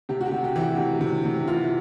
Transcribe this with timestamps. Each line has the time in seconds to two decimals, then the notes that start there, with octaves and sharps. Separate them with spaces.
0.09 C3 G4
0.21 F#4
0.26 G4
0.32 C3
0.44 G4
0.56 E3
0.61 F#4
0.78 C3
1.01 C3
1.25 C3
1.48 E3 F4